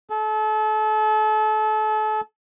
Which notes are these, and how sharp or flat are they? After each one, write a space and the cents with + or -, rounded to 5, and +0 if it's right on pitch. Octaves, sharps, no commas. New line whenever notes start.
A4 -35